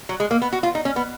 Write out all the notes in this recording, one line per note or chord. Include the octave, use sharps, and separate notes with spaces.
F#3
G#3
A#3
B3
F#4
F4
D#4
C#4
B3